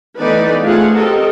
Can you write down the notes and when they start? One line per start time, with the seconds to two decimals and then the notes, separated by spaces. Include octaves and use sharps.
0.19 E3 A3 B3 D#4 B4 D5
0.62 A3 C4 F4 G#4 F5 F#5
0.95 C4 F#4 G4 A4 A#4 D#5